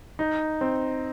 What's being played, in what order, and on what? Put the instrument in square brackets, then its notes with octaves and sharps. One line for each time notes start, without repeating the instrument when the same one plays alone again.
[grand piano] D#4
C4